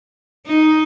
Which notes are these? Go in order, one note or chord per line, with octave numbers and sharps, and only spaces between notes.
D#4